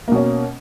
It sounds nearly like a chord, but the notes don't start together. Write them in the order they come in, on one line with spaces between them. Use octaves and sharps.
A#3 B2 C#4